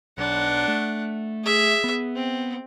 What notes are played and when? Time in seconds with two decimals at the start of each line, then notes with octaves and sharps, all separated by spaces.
0.18 B1 D4 F#5
0.68 A3
1.44 G#4 E5
1.84 B3
2.16 C4